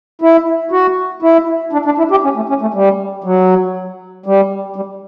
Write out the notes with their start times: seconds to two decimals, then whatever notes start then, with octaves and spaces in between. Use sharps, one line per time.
0.22 E4
0.72 F#4
1.22 E4
1.73 D4
1.85 D4
1.98 E4
2.11 G4
2.24 C#4
2.36 A3
2.49 C#4
2.61 A3
2.74 G3
3.24 F#3
4.26 G3
4.76 G3